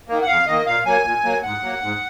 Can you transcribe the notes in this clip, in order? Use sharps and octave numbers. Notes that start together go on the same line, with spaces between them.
D#3 A#3
F#5
F2 F5
D#3 A#3 D#5
A#2 F5
F#3 A#3 G#5
A#2
F#3 A#3
G#2 F#5
F#3 A#3
G#2